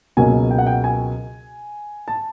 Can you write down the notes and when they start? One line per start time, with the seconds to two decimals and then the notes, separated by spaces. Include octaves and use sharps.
0.17 C#2 B2 F#3 A#3 G#5
0.51 G5
0.58 F#5
0.67 G5
0.84 G#5
2.08 A5